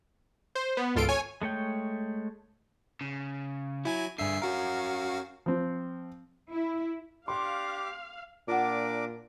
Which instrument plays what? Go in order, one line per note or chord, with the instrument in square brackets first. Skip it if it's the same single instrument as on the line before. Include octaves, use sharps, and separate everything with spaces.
[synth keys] C5
B3
G#1 C#2 F4 A4 C6 D7
C#5 G#5
[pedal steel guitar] G#3 A3 C#5 G5
[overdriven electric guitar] C#3
[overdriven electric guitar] F#3 [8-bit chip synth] E4 G#5 G#6
[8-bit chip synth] G2 E5 C7 [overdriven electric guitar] D3 G#4
[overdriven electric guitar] C#4 A#4 [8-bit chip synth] F#4 F5
[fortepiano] F3 C4
[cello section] E4
[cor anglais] D4 [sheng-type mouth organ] G4 D6 [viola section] F5 [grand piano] C6
[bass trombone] A#2 [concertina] D4 A#4 D6 [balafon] F4 F#5